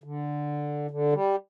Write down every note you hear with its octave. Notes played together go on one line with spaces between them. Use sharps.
D3
D3
G3